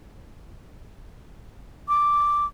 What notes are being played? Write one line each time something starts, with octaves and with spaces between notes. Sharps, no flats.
D6